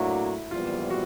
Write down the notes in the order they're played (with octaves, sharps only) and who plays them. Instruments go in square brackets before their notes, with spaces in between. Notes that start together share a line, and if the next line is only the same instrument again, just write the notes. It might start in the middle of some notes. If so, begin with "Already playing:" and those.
Already playing: [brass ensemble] A2 F#3 A#3 D4 F#4 [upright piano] E4
[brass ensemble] A#1 G#2 E3 G3 B3 [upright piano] F4
[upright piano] F#4